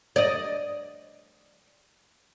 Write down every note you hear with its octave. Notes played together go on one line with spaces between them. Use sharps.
D5 D#5